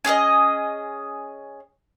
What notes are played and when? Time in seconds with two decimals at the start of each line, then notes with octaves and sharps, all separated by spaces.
0.05 C#4 G#4 A4 D#5